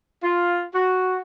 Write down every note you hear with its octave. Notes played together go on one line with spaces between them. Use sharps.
F4
F#4